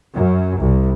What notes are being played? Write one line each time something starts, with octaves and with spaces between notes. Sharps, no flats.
F#2
C2